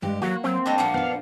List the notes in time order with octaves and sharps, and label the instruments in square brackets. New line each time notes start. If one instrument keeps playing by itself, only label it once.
[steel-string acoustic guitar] G2 G4 [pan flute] G#3
[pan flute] F#3 [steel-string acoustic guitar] A#3 F#5 [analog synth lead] F#4
[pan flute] F#3 [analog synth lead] C4
[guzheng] G3 A3 D4 [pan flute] D#5
[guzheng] A#2 F3 A#3 [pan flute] F#5
[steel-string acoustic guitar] B3 D4 [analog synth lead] F5